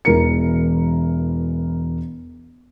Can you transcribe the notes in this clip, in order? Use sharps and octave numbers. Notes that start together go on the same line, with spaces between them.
E1 E3 A#4 C#7